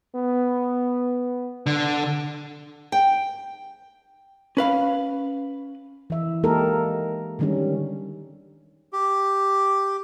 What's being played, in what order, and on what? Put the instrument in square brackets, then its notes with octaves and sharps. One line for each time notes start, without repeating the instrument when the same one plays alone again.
[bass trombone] B3
[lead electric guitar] D3
[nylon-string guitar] G5
[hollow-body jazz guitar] C#4 B4 F5 B5
[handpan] E3 E5
G#3 A#3 D#4 G4 A4 A#4
D3 D#3 G3 G#3 C#4
[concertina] G4